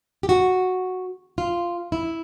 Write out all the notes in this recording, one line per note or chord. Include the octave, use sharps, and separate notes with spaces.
G4
F#4
F4
E4